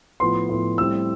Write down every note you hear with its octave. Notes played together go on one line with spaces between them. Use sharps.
A2 F3 B3 C6
A2 F3 B3
A2 G3 C4 E6